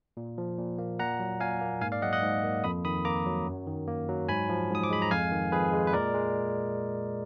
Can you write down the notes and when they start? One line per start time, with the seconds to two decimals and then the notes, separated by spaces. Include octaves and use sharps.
0.17 A#2
0.38 F3
0.58 A#2
0.78 A#3
0.99 A#2 F#5 A#5
1.20 F#3
1.40 A#2 F5 G#5
1.61 A#3
1.81 G#2 F5 G#5
1.92 D5 F5
2.02 F#3 D#5 F#5
2.13 D#5 F#5
2.22 G#2
2.43 A#3
2.64 F2 B5 D#6
2.85 D#3 B5 D#6
3.05 A#3 A#5 D6
3.26 F#3
3.47 F#2
3.67 D#3
3.88 A#3
4.08 F#3
4.29 G#2 G#5 B5
4.49 F3
4.70 G#2 D#6
4.83 D6
4.90 G#3 B5
5.02 A#5
5.11 F2 F5 G#5
5.32 D#3
5.52 F2 G#4 B4
5.73 G#3
5.87 B4
5.93 A#2 A#4 D5
6.14 G#3